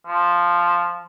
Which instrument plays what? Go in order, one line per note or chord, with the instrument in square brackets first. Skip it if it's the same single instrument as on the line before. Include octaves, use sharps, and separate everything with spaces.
[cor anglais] F3